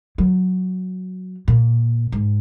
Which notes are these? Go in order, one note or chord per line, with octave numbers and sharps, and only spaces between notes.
F#3
A#2
G#2